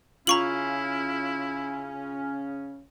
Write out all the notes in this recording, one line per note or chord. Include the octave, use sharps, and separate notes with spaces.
C#3 C#4 E4 F4 A#5 C#6 F#7